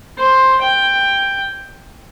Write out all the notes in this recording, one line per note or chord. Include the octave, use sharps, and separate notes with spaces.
C5
G5